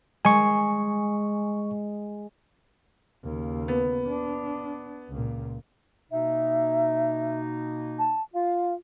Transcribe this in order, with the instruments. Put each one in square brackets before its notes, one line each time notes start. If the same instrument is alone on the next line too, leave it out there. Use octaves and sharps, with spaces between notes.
[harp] G#3 [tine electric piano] G#5 C#6
[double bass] D#2 C#3
[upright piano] B3
[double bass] D4
C#2 A#2
[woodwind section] B2 A#3 D#4 [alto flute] E5
[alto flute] A5
[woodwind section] F4 [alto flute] F5